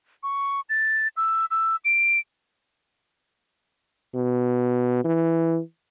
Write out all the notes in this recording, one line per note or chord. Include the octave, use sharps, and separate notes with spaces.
C#6
A6
E6
E6
D7
B2
E3